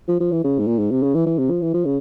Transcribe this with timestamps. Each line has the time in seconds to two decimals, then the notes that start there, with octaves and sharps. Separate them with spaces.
0.08 F3
0.20 F3
0.32 E3
0.44 C#3
0.59 G#2
0.67 A#2
0.79 G#2
0.91 C3
1.03 C#3
1.15 E3
1.26 E3
1.38 C3
1.50 F3
1.62 E3
1.74 F3
1.85 C#3